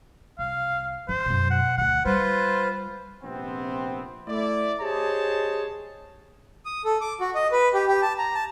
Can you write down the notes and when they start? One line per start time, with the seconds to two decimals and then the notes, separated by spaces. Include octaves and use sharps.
0.39 C2 F5
1.08 D#3 F3 C5
1.26 F#2 B2
1.50 F#5
1.78 D2 D#3 F#5
2.05 G3 F4 B4 C5
3.24 A#1 C3 B3 C4
4.28 A3 E4 D5
4.82 G4 G#4 C5 C#5 D#5 A5
6.65 D#6
6.85 A4
7.01 D6
7.21 F#4
7.35 D#5
7.52 B4
7.74 G4
7.88 G4
8.02 A5
8.18 A#5
8.35 A5